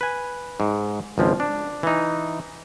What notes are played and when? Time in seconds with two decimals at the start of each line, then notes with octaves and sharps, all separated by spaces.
0.01 B4 G#5
0.60 G#2
1.18 G#1 C#2 F3
1.40 D4
1.83 E3 D#4